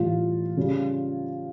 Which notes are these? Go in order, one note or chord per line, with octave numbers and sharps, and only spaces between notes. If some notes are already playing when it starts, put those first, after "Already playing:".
Already playing: A2 E3 G3 F4
C#3 G3